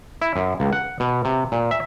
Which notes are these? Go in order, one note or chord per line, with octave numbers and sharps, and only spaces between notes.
E4
F#2
C#2
F#5
B2
C3
A#2
E5